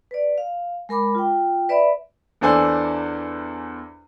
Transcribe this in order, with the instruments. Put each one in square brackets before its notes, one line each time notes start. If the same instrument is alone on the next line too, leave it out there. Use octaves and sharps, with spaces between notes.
[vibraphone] B4 D5
F5
G#3 A#4 B5 D6
F4 G5
B4 D5 E5 B5
[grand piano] E2 E3 D4 A4 C5 G#5